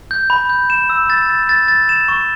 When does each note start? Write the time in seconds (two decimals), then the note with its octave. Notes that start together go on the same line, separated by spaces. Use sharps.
0.11 G6
0.30 B5
0.49 G6
0.70 E7
0.90 E6
1.10 A6
1.30 A6
1.49 A6
1.68 A6
1.89 E7
2.08 C#6